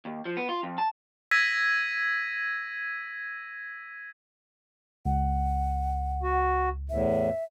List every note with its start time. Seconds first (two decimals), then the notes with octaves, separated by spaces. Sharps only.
0.05 D#2
0.25 F3
0.37 B3
0.49 F4
0.63 F2
0.78 A5
1.31 E6 G#6 A#6 B6 D#7
5.06 C#2 F#5
6.23 F#4
6.90 E2 A2 E5